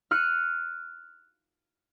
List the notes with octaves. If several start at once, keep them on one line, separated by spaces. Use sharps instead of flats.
F6 F#6 C#7 D#7